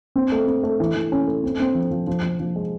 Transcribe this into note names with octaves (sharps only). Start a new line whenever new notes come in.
C4
A3
C4
A3
E3
E3
C#4
A3
C4
C4
F3
F3
F3
F3
F3
G#3